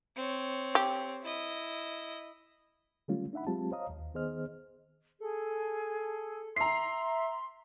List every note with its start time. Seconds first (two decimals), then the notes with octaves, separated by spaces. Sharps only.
0.16 C4 C#5
0.75 G4
1.24 E4 D#5
3.08 D3 F#3 G3 A3 C#4 F4
3.33 D4 D#4 E5 F#5 B5
3.47 F#3 G#3 C4 F4 G4 A5
3.71 C5 C#5 D#5 F5 A#5 D#6
3.90 D#2
4.14 D#3 B3 G#4 C5 D#5 F6
5.20 G#4 A4
6.56 E5 A#5 C6 C7